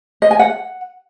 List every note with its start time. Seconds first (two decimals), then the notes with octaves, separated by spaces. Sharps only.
0.22 D#5
0.31 G#5
0.39 F#5